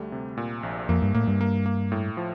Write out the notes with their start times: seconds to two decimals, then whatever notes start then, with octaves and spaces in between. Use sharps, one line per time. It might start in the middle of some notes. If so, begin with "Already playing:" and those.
Already playing: D2 G3 A3
0.12 C3
0.37 A#2
0.63 A#1
0.89 F2 A#3
1.02 G2
1.14 A2 A#3
1.27 G2
1.41 A#3
1.66 A#3
1.92 A2
2.17 F3